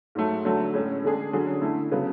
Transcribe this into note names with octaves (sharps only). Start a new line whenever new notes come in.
G#2 F#3 A3
D3 F#3 A3
A2 G#3 C#4
D3 G#3 D4 G#4
D3 F#3 C#4 G#4
D3 A3 E4
C#3 F#3 B3